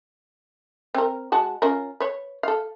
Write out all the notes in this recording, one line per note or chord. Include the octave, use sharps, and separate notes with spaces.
C4 A#4
G#3 F#4 A5
C#4 F4 A#4
B4 C#5
A4 F5